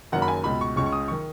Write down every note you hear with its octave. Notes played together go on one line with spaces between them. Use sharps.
F#1 F#2 D#3 F#5
B5
G#5
C#2 B2 B5
C#6
C#2 C#3 C#6
C#6
D#6
D#3 C#6